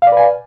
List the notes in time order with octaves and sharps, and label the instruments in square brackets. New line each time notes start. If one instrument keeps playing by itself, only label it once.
[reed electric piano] F5
D5
B4
G#5